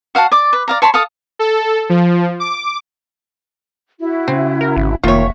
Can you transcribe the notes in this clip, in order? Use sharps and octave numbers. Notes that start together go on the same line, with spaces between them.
F#4 F5 F#5 A5
D5 D6
B4
D5 F5 A#5
C#5 A5 B5 C6
A4 F5 A5 D#6
A4
F3
D6
E4 F#4
C#3 C4
A#4
G#1
F1 D#3 A#3 F4 C#5 E5 C#6